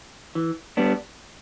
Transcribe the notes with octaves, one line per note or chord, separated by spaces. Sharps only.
E3
G3 B3 D4